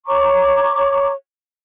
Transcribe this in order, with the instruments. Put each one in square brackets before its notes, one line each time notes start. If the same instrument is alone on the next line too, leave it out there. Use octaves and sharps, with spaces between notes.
[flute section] C#5 A#5 C#6 D6